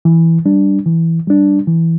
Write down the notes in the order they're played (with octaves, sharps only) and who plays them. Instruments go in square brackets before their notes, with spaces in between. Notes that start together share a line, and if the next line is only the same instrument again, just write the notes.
[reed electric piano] E3
G3 D4
E3
G3 D4
E3